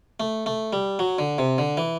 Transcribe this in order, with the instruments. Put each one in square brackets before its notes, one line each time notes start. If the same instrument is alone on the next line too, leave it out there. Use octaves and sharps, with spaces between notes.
[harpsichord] A3
A3
G3
F#3
D3
C3
D3
E3